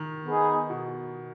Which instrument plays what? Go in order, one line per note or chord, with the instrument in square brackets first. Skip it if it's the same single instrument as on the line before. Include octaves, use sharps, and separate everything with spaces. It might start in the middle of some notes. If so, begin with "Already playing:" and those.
Already playing: [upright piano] D#3
[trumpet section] B3 D#4 G#4
[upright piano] B2